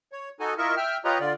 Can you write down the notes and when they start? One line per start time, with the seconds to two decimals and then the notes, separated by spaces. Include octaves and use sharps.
0.12 C#5
0.40 D#4 F#4 A4 G#5
0.58 E4 F4 A#4 D#5 E5 C#6
0.77 E5 G5 F6
1.05 F4 G4 B4 C#5 D#5 A#5
1.20 D3 F4 D5